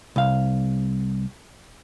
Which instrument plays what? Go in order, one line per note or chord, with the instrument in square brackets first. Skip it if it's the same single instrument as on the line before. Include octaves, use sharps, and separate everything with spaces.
[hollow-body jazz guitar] C2 F5